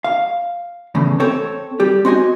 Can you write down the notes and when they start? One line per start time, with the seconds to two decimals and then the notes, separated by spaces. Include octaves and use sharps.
0.04 F5
0.95 E2 A2 C#3
1.20 C4 A4 C#5
1.80 G3 G4
2.05 C4 F#4 D#5 G#5